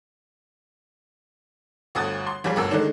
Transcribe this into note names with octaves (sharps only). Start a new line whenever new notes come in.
G1 D2 D#6 F#6 A6
C6
A#1 G3 G#4
G1 D2 A#4 E6
D3 D#3 G#3 A3 D4 D#4